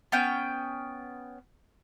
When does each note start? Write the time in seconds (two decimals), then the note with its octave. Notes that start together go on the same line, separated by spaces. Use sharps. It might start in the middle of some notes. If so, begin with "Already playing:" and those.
0.12 B3 C#4 G5